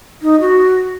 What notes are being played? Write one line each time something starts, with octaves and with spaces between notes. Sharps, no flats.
D#4
F#4